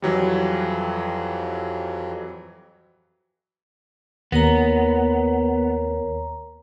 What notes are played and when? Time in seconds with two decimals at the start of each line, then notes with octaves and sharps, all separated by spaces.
0.02 F2 E3 F#3 G3
4.32 D#2 B3 A#4 C#5 A#5